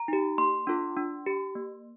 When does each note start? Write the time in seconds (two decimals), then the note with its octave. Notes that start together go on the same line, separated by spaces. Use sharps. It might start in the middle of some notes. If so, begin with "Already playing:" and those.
Already playing: A#5
0.08 D#4 G4
0.38 A#3 C6
0.67 D4 F4 A4
0.97 D4
1.26 G4
1.55 A#3